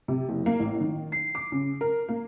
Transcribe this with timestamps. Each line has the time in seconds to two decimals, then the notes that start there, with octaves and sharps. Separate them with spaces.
0.08 C3
0.29 F#1
0.46 A#3
0.60 A1
0.81 D#3
1.12 C7
1.35 D6
1.52 C#3
1.81 A#4
2.09 A#3